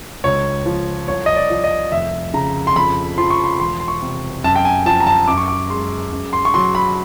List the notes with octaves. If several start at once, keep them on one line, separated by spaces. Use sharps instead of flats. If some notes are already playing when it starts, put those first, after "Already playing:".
C#2 C#5
F3
C2 C#5
D#5
D5
F3
D#5
F1 E5
C#3 A#5
C6
F2 B5
F3 C6
C#6
C6
E1 C6
C6
C#6
C3
F#2 A5
G5
G#5
F3 A5
A#5
A5
F#2 D6
C#6
D6
G#3 C6
F#2
C6
C#6
F#3 C6
B5